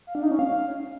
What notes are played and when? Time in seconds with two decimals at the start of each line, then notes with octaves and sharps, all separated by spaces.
0.07 F5
0.15 D4
0.23 D#4
0.31 C#4
0.39 F5